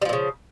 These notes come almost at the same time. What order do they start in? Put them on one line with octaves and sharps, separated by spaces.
G3 F3 A#2 C#3